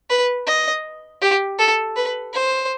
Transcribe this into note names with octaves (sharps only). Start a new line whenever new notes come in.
B4
D#5
G4
A4
B4
C5